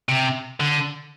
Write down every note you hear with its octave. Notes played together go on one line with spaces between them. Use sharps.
C3
D3